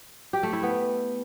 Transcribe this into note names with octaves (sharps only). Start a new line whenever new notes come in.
G4
A3
E4
B3